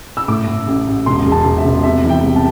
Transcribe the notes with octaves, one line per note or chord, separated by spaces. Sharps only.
E6
A2 D6
A2
A1
A1
E1 C6
E2
A5
E1
E5
E1
C3 E5
E3 E5
G5
C2
A5